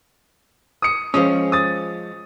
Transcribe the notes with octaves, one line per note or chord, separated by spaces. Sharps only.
D#6 C#7
F3 G#3 C#4 D#6
D#6 A6